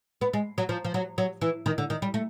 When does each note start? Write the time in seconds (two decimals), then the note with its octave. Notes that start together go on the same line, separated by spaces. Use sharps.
0.21 B3
0.33 G#3
0.58 F#3
0.69 F3
0.85 F3
0.94 F#3
1.18 F#3
1.41 E3
1.66 D#3
1.78 D3
1.90 D#3
2.02 G3
2.14 A3